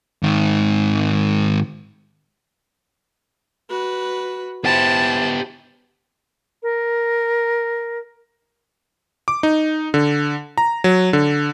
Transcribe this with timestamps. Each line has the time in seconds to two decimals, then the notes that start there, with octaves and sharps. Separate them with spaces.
0.23 G#2 D#3
3.70 F#4 B4
4.64 B3 E4 G4 C5 A5
6.63 A#4
9.28 D6
9.43 D#4
9.94 D3
10.58 A#5
10.84 F#3
11.13 D3